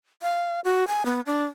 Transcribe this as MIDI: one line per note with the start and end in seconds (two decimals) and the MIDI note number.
0.22 0.60 77
0.64 0.87 66
0.88 1.05 80
1.06 1.21 59
1.26 1.44 62